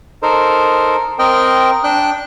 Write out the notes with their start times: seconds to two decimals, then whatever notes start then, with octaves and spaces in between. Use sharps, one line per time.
0.23 D#4 A4 A#4 C5
1.19 C4 A#4 D#5 G5
1.84 D4 G5 F#6